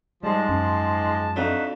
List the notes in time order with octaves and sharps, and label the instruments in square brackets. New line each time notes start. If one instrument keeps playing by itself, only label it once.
[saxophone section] G#2 F3 G#3 [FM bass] G3 [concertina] A5
[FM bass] F#2
[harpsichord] F2 D4 [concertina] D#4 F#4 E5